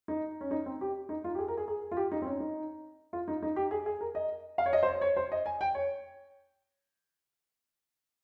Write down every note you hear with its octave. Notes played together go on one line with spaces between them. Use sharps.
D#4
C#4
D#4
C4
G4
D#4
F4
G4
G#4
A#4
G#4
G#4
F4
G4
D#4
C4
C#4
D#4
F4
D#4
D#4
G4
G#4
G#4
A#4
D#5
F5
C#5
D#5
C5
C#5
C#5
C5
D#5
G#5
G5
C#5